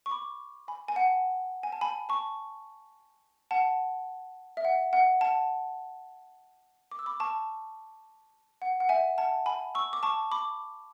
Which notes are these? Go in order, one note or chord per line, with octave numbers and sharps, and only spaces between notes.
C#6
B5 D6
G#5 B5
G#5
F#5 A5
G#5
A5
G#5 B5
A5 C#6
F#5 A5
E5
F#5
F#5
F#5 A5
D6
E6
B5 D6
A5 C#6
F#5
F#5
E5 G#5
F#5 A5
G#5 B5
C#6 E6
D6
A5 C#6
B5 D6